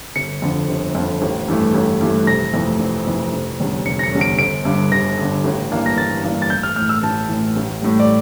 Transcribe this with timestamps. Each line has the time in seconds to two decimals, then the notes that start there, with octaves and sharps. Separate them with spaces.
0.16 G1 C#7
0.42 F2 D3
0.69 G1
0.95 F2 D3
1.22 A1
1.48 G2 E3 A3
1.74 A1
2.01 G2 E3 A3
2.27 F1 A#6
2.54 F2 E3 A3
2.80 F1
3.07 F2 E3 A3
3.33 F1
3.59 E2 D3 G3 C#4
3.86 F1 C#7
3.99 A#6
4.03 C#7
4.12 E2 D3 G3 C#4
4.21 D7
4.38 G1 D7
4.65 G2 D3
4.91 G1 A#6
5.18 G2 D3
5.44 A1
5.71 G2 E3 A#3 D4
5.86 A#6
5.97 A1 A6
6.23 G2 E3 A#3 D4
6.42 A6
6.50 A1 G6
6.63 F6
6.76 A2 F6
6.81 E3
6.89 E6
7.03 A1 A5
7.29 A2 E3
7.56 A1
7.82 A2 G3
8.00 D5